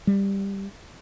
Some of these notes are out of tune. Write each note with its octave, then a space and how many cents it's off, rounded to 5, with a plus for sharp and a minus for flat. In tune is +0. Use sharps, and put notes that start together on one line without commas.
G3 +10